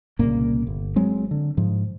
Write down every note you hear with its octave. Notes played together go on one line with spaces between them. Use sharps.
C2 A#2 C#3 A#3
G1
F#3 G#3 C4
D3
G#2 F3